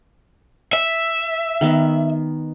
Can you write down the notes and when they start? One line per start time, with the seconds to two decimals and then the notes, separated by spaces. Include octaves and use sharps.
0.73 E5
1.61 D#3 B3